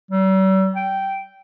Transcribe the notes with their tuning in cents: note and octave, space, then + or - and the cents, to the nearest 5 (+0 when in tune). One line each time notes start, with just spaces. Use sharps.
G3 -45
G5 -10